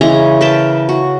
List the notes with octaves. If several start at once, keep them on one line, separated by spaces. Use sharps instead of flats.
C#3 E3 G#3 A#5
A#4 B4 G5 A5
F#4